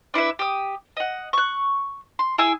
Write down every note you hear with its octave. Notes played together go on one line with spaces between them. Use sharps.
D4 E4 B4 E5
G4 D#6
D#5 F#5
C#6 F#6
C6
E4 G#4 G#5 E6